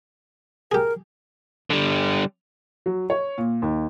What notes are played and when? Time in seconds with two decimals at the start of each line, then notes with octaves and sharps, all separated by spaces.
0.72 G4 G#4 A#4
1.70 D3 G3
2.86 F#3
3.10 C#5
3.38 A#2
3.62 D#2